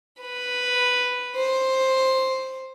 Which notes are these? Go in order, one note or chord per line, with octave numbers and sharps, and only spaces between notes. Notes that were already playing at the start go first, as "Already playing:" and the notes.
B4
C5